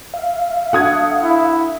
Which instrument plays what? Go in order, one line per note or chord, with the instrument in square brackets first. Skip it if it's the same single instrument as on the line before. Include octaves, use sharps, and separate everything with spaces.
[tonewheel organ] E5 F5
[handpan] D4 F#4 A4 [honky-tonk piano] F#5 D#6 G#6
[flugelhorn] E4